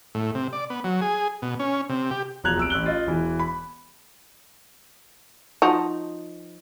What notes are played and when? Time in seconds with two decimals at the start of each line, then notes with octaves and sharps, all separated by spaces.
0.15 A2
0.35 C3
0.53 D5
0.70 B3
0.84 F#3
1.01 G#4
1.42 B2
1.59 C#4
1.89 C3
2.11 G4
2.44 E1 F3 A#5 F#6 G#6 F7
2.57 C2 E6 D7
2.70 A1 E6 F#6 G7
2.86 F4 D#5
3.06 E1 E3
3.39 B5
5.62 F3 D#4 F#4